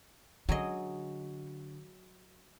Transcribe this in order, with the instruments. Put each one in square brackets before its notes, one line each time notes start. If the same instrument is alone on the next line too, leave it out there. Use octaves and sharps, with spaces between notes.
[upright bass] D3 [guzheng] F#3 G#4 D#5